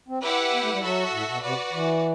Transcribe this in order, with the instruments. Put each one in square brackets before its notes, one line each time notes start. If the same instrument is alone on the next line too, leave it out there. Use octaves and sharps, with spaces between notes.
[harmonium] C4
[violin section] E4 G4 B4 F#5
[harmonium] B3
A3
G3
[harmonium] F#3 [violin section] F#4 A4 E5
[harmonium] A2
B2
[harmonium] C3 [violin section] F#4 B4 D5
[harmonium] E3